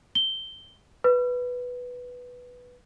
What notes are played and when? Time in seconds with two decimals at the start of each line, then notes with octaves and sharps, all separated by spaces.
0.15 G7
1.04 B4